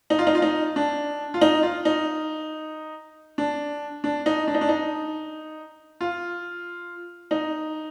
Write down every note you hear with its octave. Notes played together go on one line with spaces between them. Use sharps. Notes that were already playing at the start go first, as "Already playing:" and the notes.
D#4
F4
D#4
F4
D#4
D4
F4
D#4
F4
D#4
D4
D4
D#4
D4
D#4
D4
D#4
F4
D#4